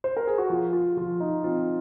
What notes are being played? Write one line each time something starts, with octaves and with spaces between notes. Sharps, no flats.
C5
A#4
G#4
F#4
F3 F4
F4
F3 F4
D#4
C4 F4